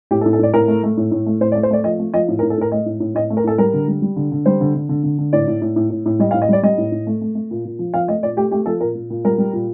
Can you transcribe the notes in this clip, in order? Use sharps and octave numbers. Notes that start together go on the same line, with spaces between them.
A2 G4
A4
A2
A4
A2 D5
A2 A#4
A3
A3
A2
A2
A3
A2 C5
D5
A3
C5
A3 D5
F3 D#5
A3
F3 D#5
A2
A#4
A2
A4
A2 A#4
A3 D#5
A2
A2
A2 D#5
A3
A#4
A2 A4
G3 A#4
D3
G3
G3
D3
D3
G3 C5
D3
D3
D3
D3
D3
A2 D5
A2
A2
A2
A2
A2
G3 D#5
F5
A2
D#5
G3 D5
G3 D#5
A2
A2
A3
A3
A3
A#2
A#2
F3
F3 F5
A3 D#5
A#2 D5
A3 G4
A3 G4
F3 A4
A#2 A#4
A#2
A#2
G3 A#4
G3
A#2